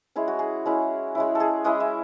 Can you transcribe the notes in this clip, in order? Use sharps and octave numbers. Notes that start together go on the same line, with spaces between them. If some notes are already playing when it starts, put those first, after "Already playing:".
G#3 C#4 E4 G#4
F#4
G#4
G#3 C#4 E4
G#3 C#4 E4
A4
G#4
G#3 C#4 E4 D#5
E5